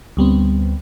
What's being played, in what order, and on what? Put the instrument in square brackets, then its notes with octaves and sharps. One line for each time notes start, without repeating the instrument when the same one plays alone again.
[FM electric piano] D2 G3 B3 C4